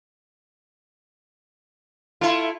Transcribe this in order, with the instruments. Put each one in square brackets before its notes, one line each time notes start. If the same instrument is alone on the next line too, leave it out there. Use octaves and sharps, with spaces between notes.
[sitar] A3 E4 [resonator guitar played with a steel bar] F4